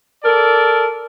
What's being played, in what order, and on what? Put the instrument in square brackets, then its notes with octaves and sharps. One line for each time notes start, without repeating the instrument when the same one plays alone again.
[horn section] A4 A#4 D5